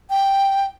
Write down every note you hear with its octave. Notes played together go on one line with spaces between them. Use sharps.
G5